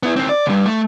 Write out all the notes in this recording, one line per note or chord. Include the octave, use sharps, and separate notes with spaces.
B3 E4
D#2 C4
D5
D2 G2
A3